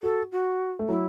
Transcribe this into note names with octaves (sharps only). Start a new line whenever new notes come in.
F#4 A4
F#4
A3
F#3 E4